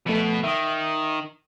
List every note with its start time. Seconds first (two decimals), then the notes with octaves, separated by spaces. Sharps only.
0.06 B2 F3 A3 B3
0.44 D#3 E5 D#6